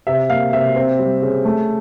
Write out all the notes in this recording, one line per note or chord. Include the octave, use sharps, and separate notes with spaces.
C3 E5
A#3 F5
C3 E5
C4
G3
C#3
A3